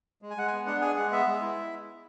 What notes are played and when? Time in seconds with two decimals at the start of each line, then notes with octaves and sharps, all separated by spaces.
0.22 G#3
0.30 G#5
0.37 G#3 F#5
0.48 B3 G#5
0.66 D4 F#5
0.81 G#4 G#5
0.96 G#3 F#5
1.11 B3 E5
1.28 G#3
1.41 E4